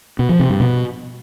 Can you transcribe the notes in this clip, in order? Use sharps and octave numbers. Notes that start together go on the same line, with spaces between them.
B2
F3
C3
G2
B2